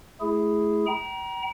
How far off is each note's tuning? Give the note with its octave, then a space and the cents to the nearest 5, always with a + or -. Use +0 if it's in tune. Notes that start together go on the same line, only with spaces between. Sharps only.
A3 -30 E4 +5 G#4 +0
G5 -35 A#5 +30